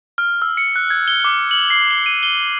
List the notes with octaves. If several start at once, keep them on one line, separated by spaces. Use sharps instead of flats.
F6
E6
C#7
F#6
G#6
G7
D6
F#7
C7
G7
D#7
G7